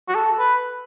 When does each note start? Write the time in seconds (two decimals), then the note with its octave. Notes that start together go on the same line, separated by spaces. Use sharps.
0.08 F#4
0.15 A4
0.39 B4